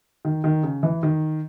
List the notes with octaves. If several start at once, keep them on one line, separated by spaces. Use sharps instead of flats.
D#3
D#3
C#3
E3
D#3